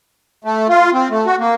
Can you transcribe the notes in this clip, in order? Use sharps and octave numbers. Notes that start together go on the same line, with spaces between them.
A3
F4
C4
A3
F#4
A#3